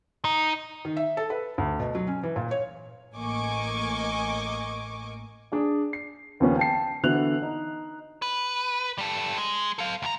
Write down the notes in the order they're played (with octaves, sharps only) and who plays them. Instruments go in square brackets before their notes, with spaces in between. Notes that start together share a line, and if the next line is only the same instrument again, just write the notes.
[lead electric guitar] D#4
[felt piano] D#3
E5
A4
B4
D2
B2
F#3
C#4
E3
A#2
C#5
[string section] A1 A#3 D#5 G#5 C#6 D6
[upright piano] D4 G#4 D5
C7
D#2 C#3 F3 B3 C#4
G5 A5 C7
D3 E3 B3 F#4 F#6 F7
D#4
[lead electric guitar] B4
G3 A4
G#3
A4 F5
D2 A#5